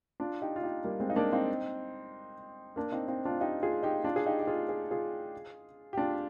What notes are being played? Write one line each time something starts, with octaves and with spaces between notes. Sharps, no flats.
D4 F4
D#4 G4
F4
D#4 G4
G3 A#3
G#3 C4
D#4
A#3 D4
C4 D#4
A#3 D4
C4 D#4
C4 D#4
D4 F4
D#4 G4
F4 G#4
D#4 G4
D4 F4
G#4
D#4 G4
G4
F4 G#4
G#4
F4 G#4
G4
D4 F4